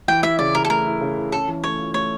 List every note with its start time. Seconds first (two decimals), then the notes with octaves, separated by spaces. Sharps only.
0.08 E3 G5
0.23 E4 E5
0.39 C#3 D5
0.55 C#3 A#4
0.65 A4
0.70 A3 A#4
0.86 E4
1.01 C#3
1.17 E4
1.32 C#4 A4
1.48 E3
1.64 A3 C#5
1.79 F4
1.94 A3 C#5